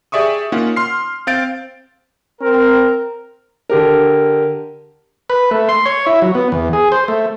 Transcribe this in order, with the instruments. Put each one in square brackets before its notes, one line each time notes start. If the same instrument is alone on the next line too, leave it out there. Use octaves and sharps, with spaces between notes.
[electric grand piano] G4 G#4 D5 E5 C#6 D#6
A#3 C#4 D#4 F4 F#5
C6 F6 C7
C4 F5 G6 A6 D7
[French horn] C4 [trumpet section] A#4
[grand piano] D3 G4 A#4
[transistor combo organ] B4
A3
C6
C#5
E4
F#3
B3
E2
G#4
C5
A3